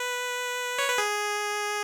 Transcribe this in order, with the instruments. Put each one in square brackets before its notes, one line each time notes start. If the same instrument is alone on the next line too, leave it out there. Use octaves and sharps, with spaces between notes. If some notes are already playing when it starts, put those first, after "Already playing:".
Already playing: [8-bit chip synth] B4
C#5
B4
G#4